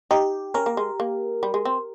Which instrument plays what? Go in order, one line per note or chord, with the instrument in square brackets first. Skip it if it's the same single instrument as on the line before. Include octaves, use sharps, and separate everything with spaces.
[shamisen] D#4 [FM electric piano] G4
[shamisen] C#4 [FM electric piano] A#4
[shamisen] A#3
G#3
A#3
G3
G#3
C4